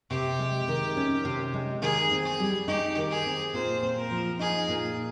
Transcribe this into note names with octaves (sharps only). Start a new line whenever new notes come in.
C3 G4
G#3
D#3
C#4
C3
G#3
D#3 G#4
C4
G#4
G3
D#4 G4
D#3
G#4
C4
A#2 C5
C4
A#4
F3
D#4 G#4
A#2